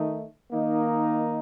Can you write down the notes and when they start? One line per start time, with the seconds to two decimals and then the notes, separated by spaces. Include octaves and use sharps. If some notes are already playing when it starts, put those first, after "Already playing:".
Already playing: D#3 A3 D#4
0.51 D#3 A#3 D#4